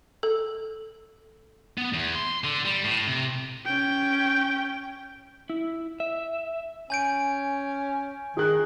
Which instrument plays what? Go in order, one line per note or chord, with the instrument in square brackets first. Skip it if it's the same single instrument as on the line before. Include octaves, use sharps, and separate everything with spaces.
[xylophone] A4
[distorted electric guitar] B3
E2
C6
D3
G3
A2
C3
[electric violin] C#4 G5
[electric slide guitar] E4
E5
[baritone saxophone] C#4 [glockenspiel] G#5 G6 D7
[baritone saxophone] D#3 [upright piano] G#4 F#6